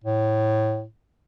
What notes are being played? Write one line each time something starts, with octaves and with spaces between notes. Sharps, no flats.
A2